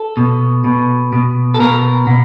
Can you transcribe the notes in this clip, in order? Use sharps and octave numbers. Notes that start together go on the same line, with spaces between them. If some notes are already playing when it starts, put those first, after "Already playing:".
Already playing: A4
B2
B2
B2
A4
B2 A#4
B2